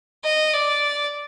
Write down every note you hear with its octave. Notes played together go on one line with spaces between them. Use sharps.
D#5
D5